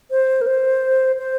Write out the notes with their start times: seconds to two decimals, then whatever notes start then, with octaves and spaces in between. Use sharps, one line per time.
0.11 C5
0.41 A#4
0.47 C5
1.19 C5